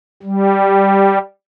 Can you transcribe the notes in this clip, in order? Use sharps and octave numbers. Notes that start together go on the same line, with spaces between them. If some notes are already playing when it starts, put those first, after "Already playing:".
G3